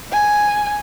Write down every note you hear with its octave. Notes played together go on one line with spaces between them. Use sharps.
G#5